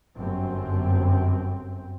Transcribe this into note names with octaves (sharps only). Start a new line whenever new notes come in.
G1 F#2 C4